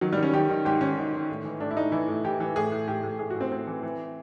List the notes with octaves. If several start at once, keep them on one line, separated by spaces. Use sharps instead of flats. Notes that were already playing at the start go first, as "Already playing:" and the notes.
D#3 F#3
G3
D#3
C#4
D#3 G4
D#3
G#2 G4
D#3 C#4
D#3
D#3
A2
E3
A2 D4
E4
A2 D#4
E3 E4
A2
E3 G4
E3
A2 G#4
A2
A2 G4
A2
A2 G#4
F#4
A2
C4
A2 C4
E3
E3